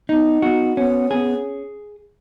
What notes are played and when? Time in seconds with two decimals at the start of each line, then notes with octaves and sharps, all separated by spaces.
0.09 B3 D#4
0.42 B3 F#4
0.77 B3 C#4
1.11 B3 G#4